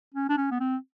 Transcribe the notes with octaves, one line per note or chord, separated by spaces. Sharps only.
C#4
D4
C#4
B3
C4